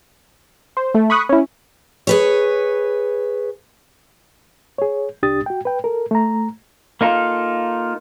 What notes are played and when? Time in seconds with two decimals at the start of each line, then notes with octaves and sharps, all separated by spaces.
0.77 C5
0.95 A3
1.10 B5 C#6 D#6 F#6
1.29 C#4 E4
2.07 G#4 B4 C#5
4.78 G#4 C#5
5.23 C2 D4 G4 D#6 A6
5.46 F#4 G5
5.65 B4 G5
5.84 A4 A#4
6.11 A3 A#5
7.01 A#3 D#4 F4 A4